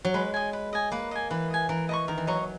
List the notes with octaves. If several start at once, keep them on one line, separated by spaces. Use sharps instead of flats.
F#3
G#3 B4
D#5 G#5
B4
D#5 G#5
A#3 B4
D#5 G#5
E3 B4
D#5 G#5
E3 A#4
D#5 A#5 C#6
D#3 A#4
E3
F#3 D#5 A#5 C#6